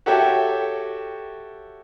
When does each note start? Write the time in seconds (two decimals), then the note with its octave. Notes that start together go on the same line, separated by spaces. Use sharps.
0.06 F#4 G4 A4 C#5 E5 G5